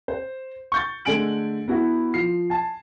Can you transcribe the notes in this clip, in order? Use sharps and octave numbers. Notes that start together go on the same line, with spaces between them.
C5
C#6 G6 A6
D3 G#3 A3 G#5 D7 F#7
B3 E4 F#4
F3 C7
G#5 A5